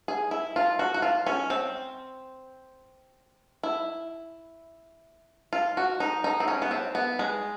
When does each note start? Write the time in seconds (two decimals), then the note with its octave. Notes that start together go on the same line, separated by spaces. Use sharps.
0.08 G#4
0.31 E4
0.56 F4
0.79 F#4
0.94 F#4
1.02 F4
1.26 C#4
1.50 C4
3.63 E4
5.53 F4
5.77 F#4
6.00 D#4
6.24 D#4
6.40 C4
6.48 C#4
6.62 B3
6.71 C4
6.95 B3
7.19 G#3